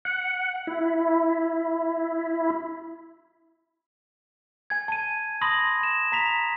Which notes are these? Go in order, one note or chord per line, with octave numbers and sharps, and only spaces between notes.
F#5
E4
G#5 G#6
A5 D#7
A5 B5 C6 D#6 A#6 F#7
E7
A#5 B6 F7